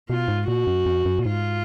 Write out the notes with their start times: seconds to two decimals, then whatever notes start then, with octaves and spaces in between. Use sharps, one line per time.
0.10 B2 F4
0.28 G#2
0.48 A#2 F#4
0.67 F#2
0.86 F2
1.05 F#2
1.19 A#2
1.25 G#2 F4